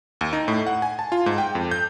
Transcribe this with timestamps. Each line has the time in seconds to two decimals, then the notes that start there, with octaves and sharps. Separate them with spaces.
0.21 D#2
0.33 D#4
0.48 A2
0.67 F#5
0.82 G#5
0.99 A5
1.12 F4
1.26 G#2
1.38 G5
1.55 F2
1.71 G6